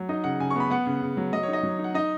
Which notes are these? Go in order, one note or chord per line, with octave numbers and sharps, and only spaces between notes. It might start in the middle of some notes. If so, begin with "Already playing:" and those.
Already playing: F#3
D#4 D#5
C#3 F#5
C#3 G#5
C#6
B3 B5
B3 F#5
C#3
C#3
F#3
F#3 D#5
C#5
D#4
D#5
F#3
D#4
F#5
D#4 D#5